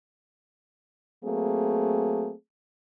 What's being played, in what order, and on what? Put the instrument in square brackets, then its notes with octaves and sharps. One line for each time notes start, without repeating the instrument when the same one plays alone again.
[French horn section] F#3 A3 A#3 C4 G#4